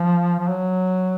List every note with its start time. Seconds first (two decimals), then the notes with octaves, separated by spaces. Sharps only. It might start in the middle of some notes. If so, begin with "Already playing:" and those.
Already playing: F3
0.39 F3
0.48 F#3